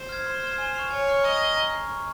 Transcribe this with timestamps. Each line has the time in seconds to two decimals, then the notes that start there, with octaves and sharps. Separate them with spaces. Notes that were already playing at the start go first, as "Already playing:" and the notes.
Already playing: C5
0.09 F6 G#6
0.26 C6
0.43 F6 G#6
0.58 G#5
0.75 C#6 F6 C7 F7
0.90 C#5 G#5
1.07 C#6 F6 C7 F7
1.23 D#5 A#5
1.40 C#6 F6 C7
1.56 A#5
1.72 C#6 F6 C7
1.88 C#6